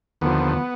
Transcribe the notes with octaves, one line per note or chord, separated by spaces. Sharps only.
D#2 D3 F3 B3